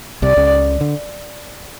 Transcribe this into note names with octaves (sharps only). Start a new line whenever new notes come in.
C2 C3 D5
C#2 C#3
D3